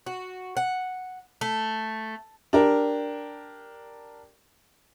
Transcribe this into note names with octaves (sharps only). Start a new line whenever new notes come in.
F#4
F#5
A3
D4 G4 A#4